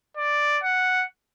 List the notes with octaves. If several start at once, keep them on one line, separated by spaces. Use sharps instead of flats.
D5
F#5